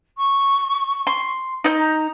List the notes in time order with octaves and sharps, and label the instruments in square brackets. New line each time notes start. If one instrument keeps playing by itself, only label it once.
[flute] C#6
[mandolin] C6
D#4 G6
[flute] A#5